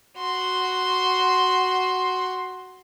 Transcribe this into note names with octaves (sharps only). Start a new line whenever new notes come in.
F#4 C6